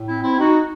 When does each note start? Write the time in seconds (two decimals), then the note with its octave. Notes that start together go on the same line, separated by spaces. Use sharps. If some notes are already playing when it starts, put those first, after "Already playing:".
Already playing: A2
0.08 C4 E4
0.23 C4 E4
0.39 D#4 F#4